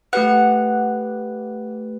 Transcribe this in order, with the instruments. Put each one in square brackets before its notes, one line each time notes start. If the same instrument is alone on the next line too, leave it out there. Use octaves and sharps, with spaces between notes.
[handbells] A3 G4 B4 [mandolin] F#5